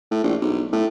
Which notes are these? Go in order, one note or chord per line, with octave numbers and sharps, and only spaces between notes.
A2
A#1
B1
A2